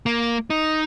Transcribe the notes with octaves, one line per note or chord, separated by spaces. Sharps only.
A#3
D#4